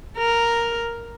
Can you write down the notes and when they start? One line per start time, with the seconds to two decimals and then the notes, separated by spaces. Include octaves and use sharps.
0.18 A#4